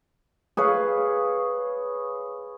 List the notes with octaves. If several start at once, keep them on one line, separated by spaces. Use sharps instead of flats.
G#4 B4 C#5 F5